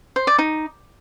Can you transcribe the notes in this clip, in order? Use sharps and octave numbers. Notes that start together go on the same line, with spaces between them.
C5
D5
D#4